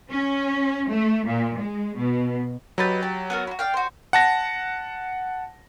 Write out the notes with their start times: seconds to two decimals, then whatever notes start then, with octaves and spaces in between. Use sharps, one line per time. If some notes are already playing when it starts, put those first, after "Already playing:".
0.11 C#4
0.89 A3
1.26 A#2
1.59 G#3
1.97 B2
2.78 F#3 G4 B4 D#5 A6
3.03 G4
3.30 B3 F#4 A#4
3.47 E4 F#4
3.59 D5 F5 G5
3.74 F#4 C5
4.13 F#5 A5 A#6